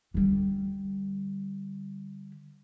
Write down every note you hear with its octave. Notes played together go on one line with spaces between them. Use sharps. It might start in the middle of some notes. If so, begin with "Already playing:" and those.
D3 G3